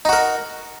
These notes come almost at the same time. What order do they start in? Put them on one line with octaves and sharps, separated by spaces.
D#4 F#4 A#4